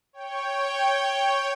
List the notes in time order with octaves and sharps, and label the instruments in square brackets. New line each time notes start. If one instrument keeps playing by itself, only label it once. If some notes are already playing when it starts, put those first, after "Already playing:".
[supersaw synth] C#5 G5